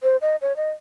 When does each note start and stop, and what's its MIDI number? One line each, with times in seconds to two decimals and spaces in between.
0.03 0.16 72
0.21 0.36 75
0.41 0.56 73
0.56 0.70 75